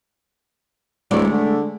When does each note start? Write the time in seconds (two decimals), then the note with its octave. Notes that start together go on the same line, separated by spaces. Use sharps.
1.11 D1 G#3 A3 D5
1.32 D3